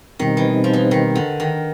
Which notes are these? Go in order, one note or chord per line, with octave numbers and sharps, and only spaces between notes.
B2 D#3 G3 C4 D#4
E3
F3
E3
D#3
D3
D#3